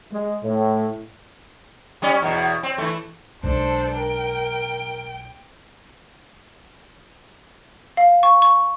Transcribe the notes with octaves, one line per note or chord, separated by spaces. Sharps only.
G#3
A2
G3 C#4 D5
E2 B2
C4
E3 A3
B1 G#3 D4 A4 C5
A#4 G5
F5
C#6
C#6